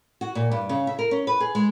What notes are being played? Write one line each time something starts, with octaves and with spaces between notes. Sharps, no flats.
F#4
A#2
G2
C#3
E5
A#4
C#4
B4
G#4
G#3